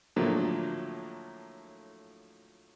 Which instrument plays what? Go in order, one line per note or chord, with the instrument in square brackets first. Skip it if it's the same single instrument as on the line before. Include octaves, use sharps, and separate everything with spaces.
[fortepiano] A2 D3 F3 F#3 A3 A#3